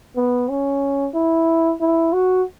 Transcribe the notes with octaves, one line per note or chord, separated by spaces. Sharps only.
B3
C#4
E4
E4
F#4